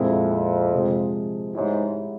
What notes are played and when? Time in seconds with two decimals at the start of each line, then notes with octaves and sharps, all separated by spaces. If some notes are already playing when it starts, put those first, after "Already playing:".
Already playing: F2 A#2 G#3 C4 E4 A#4
0.72 C3 F3 G#3
1.55 G#2 G#3 E4 G4 C#5